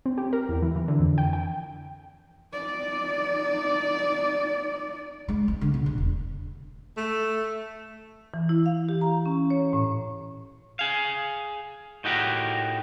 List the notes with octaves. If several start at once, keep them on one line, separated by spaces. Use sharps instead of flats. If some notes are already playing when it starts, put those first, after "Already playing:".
C4
G4
A#4
E2
E3
E3
D3
F2
G5
G5
D#4 D5
G#3
C4
D3
B2
A#1
E1
A3
E3
E4
F5
G4
A#5
C#4
C#5
A2
G#4 F5
A2 D#4 F#4 G4 A#4